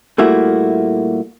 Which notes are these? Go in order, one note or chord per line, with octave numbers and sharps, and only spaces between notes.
A#2 G3 A3 A#3 E4 F#4